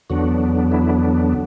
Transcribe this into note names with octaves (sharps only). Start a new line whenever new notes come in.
E2 D3 F#3 B3 D4 F#4
E4